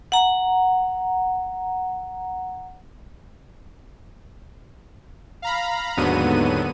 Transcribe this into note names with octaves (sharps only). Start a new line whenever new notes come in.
F#5 A#5
F5 A#5 B5
D#2 G#2 D3 F#3 B3 D#7